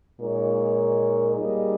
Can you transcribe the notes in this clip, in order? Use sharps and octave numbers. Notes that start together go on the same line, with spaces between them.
A#2 G#3 D#4 A#4 C#5
G3 A#3 D#4 G#4 D#5